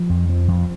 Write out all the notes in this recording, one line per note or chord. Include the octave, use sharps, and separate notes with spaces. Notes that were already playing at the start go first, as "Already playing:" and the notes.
Already playing: F3
F2
F3
F2